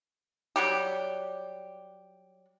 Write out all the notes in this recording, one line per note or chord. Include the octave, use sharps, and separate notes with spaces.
F#3 G3 G4